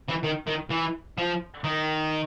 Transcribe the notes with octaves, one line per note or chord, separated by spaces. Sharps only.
E3
D#3
D#3
E3
F3
D#3